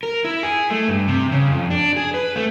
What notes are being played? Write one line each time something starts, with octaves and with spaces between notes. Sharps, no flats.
A#4
E4
G#4
A3
G2
C3
C#3
F2
D4
G#4
B4
A3